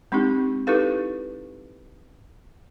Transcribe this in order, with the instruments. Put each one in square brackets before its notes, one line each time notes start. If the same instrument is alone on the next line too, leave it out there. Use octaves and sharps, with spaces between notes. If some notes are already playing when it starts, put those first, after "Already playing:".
[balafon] G#3 C4 D4 D#4 G4
D#4 E4 G4 A4 B4 F5